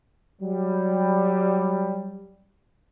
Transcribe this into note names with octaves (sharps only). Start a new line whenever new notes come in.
F#3 G3